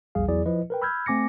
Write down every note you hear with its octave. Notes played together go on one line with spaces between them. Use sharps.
A#1 E2 G3 G#4 F5
E2 F#3 E4 G#4 D5
F3 E4 B4 D#5
A#4 B4 G5
B5 E6 F6 G6 G#6
A3 C4 G#5 D6 A#6 C#7